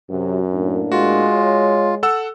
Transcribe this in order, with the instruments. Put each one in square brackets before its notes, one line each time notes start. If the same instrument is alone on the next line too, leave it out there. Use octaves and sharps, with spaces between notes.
[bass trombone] F#2 [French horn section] C3 F#3
[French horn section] A2 A#3 D4
[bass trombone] G#3 [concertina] F4 [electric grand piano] F#4
[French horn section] C#5
[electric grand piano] A4 F#5 E6